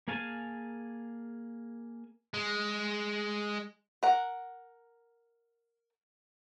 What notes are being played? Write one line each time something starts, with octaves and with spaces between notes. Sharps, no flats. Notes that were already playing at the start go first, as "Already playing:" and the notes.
A#3 G#4 F5 G#5 A5
G#3
A#4 F#5